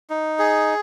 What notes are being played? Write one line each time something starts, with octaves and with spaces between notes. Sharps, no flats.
D#4
G#4